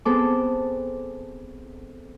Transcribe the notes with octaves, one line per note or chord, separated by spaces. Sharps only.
B3 C4 G#4 A4 D6